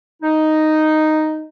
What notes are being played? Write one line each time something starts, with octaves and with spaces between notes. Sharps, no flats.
D#4